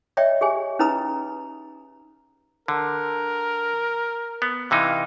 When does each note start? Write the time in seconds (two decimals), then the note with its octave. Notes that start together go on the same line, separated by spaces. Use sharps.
0.17 C#5 D#5 E5 G5
0.41 G4 G#4 G#5
0.79 C#4 D#4 B4 A#5 B5 D#6
2.68 D3 A#4
4.42 B3
4.71 C3 E3 D#4 F5